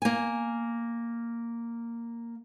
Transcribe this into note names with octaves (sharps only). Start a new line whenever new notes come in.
A#3 G#5